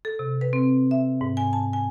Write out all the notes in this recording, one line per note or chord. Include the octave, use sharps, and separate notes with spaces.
A4
C3
B4
C4
E5
G#2
G#5
A5
G#5